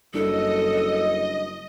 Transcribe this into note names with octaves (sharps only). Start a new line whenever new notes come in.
F#1 G3 D4 E4 A4 D#5